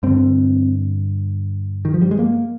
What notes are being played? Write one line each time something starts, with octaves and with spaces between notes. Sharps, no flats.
G2 D3 C4
D#3
F3
G3
G#3
A#3